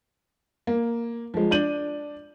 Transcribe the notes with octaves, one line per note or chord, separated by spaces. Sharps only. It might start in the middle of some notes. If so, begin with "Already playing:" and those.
A#3
F3 G#3
D4 D5 G6 D#7 F#7